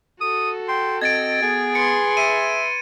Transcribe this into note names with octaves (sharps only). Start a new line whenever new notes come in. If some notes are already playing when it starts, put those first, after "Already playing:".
F#4 A4 D#6
G5 C6
C4 D#5 G#6 A6 D7
B3 G#4
B4 C6 C#7
E5 D#7